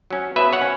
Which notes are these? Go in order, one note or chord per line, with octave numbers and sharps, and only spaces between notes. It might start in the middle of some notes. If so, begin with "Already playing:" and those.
F#3 C#4
B2 B4 E5
C#5 F#5
C#4